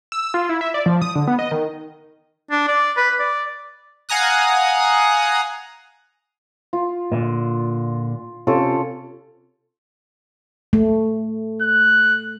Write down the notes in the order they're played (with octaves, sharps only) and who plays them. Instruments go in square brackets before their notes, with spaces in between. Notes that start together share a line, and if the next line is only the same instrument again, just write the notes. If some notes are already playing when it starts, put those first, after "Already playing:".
[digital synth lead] E6
F4
E4
E5
D5
F3
D#6
D3
B3
D#5
D#3
[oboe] D4
D5
B4
D5
[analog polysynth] F5 F#5 G#5 A#5 D#6 F#6
[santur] F4
[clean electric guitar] A#2 D3
[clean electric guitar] C3 [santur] C#4 F4 A4
[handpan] A3
[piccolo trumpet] F#6